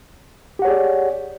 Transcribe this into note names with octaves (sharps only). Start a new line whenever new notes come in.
G4 G#4 C#5 D5 F#5